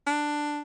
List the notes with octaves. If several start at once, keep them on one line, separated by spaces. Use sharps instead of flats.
D4